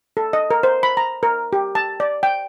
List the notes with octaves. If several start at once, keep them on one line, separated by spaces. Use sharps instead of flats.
A4
D#5
A#4
C5
B5
A#5
A#4
G4
A5
D5
G5